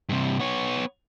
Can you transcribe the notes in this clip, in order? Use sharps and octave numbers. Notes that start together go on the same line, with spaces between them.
G2 C3
B3 C#5